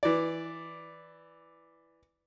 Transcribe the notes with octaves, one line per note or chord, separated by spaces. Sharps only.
E3 D5